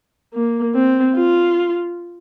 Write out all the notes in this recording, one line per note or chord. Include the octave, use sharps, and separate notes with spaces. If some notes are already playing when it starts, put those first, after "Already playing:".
A#3
C4
F4